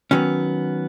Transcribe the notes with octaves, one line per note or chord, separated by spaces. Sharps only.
D#3 F#3 B3 C#4